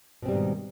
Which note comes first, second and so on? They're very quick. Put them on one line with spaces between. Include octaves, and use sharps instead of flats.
B2 C4 G3 G#2 D#3